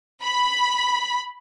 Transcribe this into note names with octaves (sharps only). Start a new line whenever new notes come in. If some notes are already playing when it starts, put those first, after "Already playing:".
B5